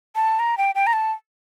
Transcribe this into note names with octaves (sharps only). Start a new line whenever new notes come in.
A5
A#5
G5
G5
A#5
A5